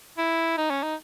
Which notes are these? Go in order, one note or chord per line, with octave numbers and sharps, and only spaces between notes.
E4
D#4
C#4
D#4